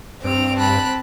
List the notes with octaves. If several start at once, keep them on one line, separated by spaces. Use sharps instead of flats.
G2 C4 D7 F7
A5 B5 F#6